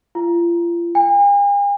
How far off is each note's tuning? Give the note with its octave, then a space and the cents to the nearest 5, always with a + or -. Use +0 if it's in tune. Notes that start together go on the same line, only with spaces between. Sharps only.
F4 -35
G#5 -45